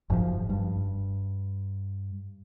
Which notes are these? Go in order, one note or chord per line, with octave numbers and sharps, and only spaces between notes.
F#1 G#2 C3 F3
G2